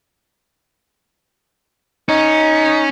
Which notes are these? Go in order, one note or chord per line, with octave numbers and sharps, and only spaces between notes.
C#4 D#4